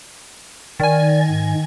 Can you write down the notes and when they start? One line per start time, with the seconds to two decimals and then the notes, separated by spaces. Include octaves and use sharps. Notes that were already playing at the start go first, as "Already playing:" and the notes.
0.80 D#3 D5 G#5
1.28 G#2